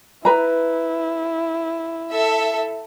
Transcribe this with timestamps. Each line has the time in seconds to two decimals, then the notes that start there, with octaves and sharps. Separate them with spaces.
0.25 E4 B4 A#5
2.11 A4 E5